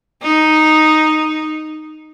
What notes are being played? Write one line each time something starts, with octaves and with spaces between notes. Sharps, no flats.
D#4